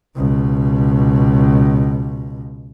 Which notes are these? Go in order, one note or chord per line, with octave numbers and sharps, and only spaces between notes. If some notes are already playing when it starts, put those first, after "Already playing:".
C#2 B2